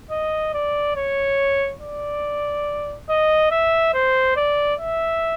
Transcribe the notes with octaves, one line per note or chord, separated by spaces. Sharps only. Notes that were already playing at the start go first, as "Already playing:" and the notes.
D#5
D5
C#5
D5
D#5
E5
C5
D5
E5